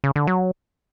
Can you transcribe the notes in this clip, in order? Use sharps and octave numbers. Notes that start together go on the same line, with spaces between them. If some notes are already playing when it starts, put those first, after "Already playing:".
C#3
D3
F#3